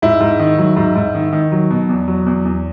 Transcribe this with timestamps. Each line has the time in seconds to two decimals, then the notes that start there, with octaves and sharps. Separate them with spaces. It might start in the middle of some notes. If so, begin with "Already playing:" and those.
0.02 G#2 E4
0.21 G#2
0.40 D#3
0.58 F#3
0.76 G#2
0.96 G#2
1.15 D#3
1.33 D#3
1.52 F#3
1.70 B2
1.89 E2
2.08 F#3
2.26 E2
2.45 E2